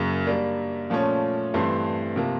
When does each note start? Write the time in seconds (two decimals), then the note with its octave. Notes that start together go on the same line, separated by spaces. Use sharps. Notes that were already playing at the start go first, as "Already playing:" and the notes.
Already playing: F#2 C#3 F#3 A#3
0.27 G3 A#3 D4
0.90 A#2 F3 A3 C#4
1.54 G2 E3 A3 C4
2.16 C3 F3 A#3